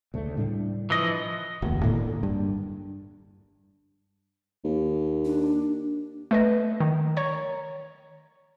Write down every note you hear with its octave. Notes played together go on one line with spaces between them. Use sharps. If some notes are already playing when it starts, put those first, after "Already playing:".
D2 C#3 A3
A2 G3 D4
E3 F3 D#5
F1 D#2
A2 D3 A#3
G2
D#2
D4
A3 B4 D#5
D#3
C#5 A#5 C#6